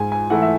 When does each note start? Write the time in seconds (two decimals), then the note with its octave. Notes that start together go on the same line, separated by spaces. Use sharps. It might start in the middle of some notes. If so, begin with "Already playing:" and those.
Already playing: G#2 G#5
0.12 G#5
0.30 E3 A3 E4 F#5
0.42 E5